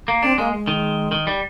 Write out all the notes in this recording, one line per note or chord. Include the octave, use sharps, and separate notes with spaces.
A#3
C4 D4
G#3 A#3
G#3
D#3
D#3
G3